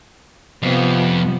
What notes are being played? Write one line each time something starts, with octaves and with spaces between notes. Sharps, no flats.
F2 C3 F3 B3